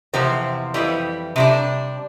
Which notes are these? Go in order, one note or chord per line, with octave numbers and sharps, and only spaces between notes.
E2 C3 F3 C4
F2 E3 G3
C3 G3 D4